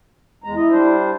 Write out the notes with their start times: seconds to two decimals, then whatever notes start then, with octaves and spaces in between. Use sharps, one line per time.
0.44 E2 G#3 A#5
0.56 E4 D#5
0.70 G3 D4 C5